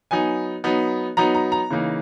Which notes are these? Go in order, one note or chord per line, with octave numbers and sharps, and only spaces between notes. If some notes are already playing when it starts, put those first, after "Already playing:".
F#3 B3 D#4 G#5
F#3 B3 D#4
F#3 B3 D#4 A#5
A#5
A#5
C#3 E3 A#3 D#4